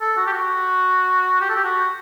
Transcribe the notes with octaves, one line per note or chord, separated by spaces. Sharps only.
A4
F#4
G4
F#4
G4
A4
G4
F#4